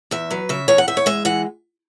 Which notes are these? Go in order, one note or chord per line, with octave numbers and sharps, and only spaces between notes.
E2 E5
F#3 B4
C#3 E5
E2 C#5
F#5
E2 E5
C#5
G#3 E5
E3 F#5